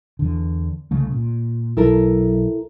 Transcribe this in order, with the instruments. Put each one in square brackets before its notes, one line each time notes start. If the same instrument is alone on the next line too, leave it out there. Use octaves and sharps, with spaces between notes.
[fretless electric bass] E2 D3
C2 C#3 A3
A#2
[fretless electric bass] B1 [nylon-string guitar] E4 A4 A#4